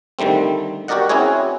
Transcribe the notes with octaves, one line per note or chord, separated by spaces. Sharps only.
D3 D#3 G3 A3 C4
F#4 G4 A#4 D5 D#5 F#5
C4 C#4 E4 F#4 G#4 C#5